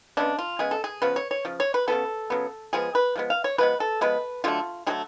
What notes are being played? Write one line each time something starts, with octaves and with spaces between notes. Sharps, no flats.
C#3 G#3 B3 D4
F4
C#3 G#3 B3 G#4
A4
G#4
C#3 F3 B3 B4
C#5
C#5
C#3 F3
C#5
B4
C#3 F#3 B3 A4
C#3 F#3 B3
F3 G#3 B3 G#4
B4
F3 G#3 B3
F5
C#5
F3 G#3 B3 B4
A4
F3 G#3 B3 B4
D3 F#3 A3 F4
D3 F#3 A3 G#4